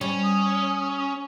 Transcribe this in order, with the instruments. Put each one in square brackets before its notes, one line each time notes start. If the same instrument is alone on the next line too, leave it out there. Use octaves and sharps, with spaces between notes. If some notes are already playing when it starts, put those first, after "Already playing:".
[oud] G3 [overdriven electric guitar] C#4
[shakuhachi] D#6